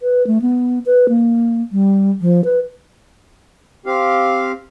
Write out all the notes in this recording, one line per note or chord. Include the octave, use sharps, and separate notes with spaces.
B4
A3
B3
B4
A#3
G3
F3
B4
C4 G4 F5